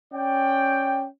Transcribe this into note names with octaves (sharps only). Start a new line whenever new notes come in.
C#4 D5 G5